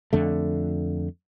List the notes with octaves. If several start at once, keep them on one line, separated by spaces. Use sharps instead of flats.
F2 D3 A3